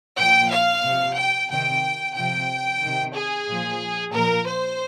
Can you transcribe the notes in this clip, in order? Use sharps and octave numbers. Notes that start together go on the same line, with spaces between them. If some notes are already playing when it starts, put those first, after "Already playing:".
A#2 F3 G5
F5
C3 F3
G5
C3 D#3 G5
C3 F3 G5
C3 D#3
G#4
A#2 F3
A#2 F3 A#4
C5